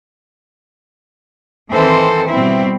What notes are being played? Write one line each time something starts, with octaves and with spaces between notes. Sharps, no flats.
D#3 E3 C4 A4 C5
B2 G3 C4 E4